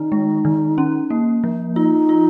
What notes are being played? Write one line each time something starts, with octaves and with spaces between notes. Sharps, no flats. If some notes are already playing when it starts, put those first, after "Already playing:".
Already playing: D#3 D#4
G#3
D#3
C#4
A#3
F3
D#4 F4
F4